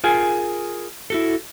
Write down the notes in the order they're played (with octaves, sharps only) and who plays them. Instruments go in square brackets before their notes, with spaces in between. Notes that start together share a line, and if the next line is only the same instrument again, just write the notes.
[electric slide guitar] F4 G#4 A#4 G#5
E4 F#4 A4